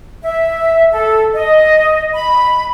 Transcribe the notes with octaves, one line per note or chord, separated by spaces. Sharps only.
E5
A4
D#5
B5